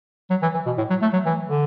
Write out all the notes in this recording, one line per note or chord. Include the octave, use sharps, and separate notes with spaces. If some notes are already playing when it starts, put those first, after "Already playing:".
F#3
E3
E3
B2
A2
F#3
A3
F#3
E3
D3